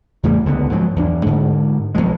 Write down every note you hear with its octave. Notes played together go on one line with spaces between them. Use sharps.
E2 A2 C#3 G3
C#2 D3 D#3 B3
G#2 F3 F#3
E2 D4
G#2 D3
B1 F#2 F3 G#3